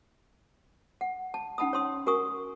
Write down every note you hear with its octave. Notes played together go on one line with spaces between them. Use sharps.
F#5
A5
C#4 D#4 F#5 A5 B5 D#6
C#5 A5 C6 D#6
F#4 A#4 G#5 C#6 D#6